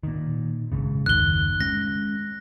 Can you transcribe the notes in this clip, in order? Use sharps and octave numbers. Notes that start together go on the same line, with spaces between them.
A#2 D#3
G#1 G#2 C#3
F#1 D#2 D#3 F#6 G7
G#3 C#4 A#6